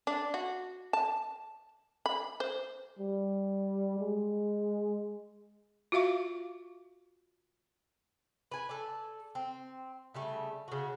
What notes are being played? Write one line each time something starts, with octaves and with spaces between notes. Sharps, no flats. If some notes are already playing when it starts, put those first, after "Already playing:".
D4
F#4
A5
B5
C5
G3
G#3
F4 F#4 E5 F5 C#6
B4 G#5
A4 D5
C4
C#3 G3 A3
C#3 F#4